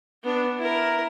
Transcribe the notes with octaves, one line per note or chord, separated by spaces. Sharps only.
B3 D4
E4 A#4